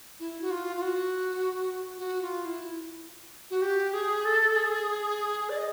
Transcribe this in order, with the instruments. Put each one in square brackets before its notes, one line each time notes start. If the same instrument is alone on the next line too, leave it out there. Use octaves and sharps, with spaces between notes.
[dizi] E4
F#4
F4
F4
F#4
F#4
F4
E4
F#4
G4
G#4
A4
G#4
D5
D#5